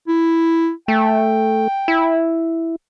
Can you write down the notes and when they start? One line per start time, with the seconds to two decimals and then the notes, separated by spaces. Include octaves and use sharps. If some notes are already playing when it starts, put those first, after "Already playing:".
0.08 E4
0.88 A3 G5
1.88 E4